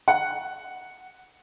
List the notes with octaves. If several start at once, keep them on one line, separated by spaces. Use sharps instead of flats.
F#5 C#7